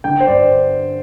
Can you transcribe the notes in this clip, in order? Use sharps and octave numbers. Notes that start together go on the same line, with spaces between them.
D3 G5
C5
G2 D5